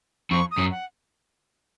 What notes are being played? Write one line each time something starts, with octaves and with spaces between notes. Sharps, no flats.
F2 C#6
D#6
F#2
F#5